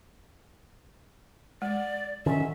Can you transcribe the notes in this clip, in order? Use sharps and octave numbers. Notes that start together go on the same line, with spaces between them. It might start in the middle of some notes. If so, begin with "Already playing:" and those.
G#3 D5
D3 D#3 C#4 E5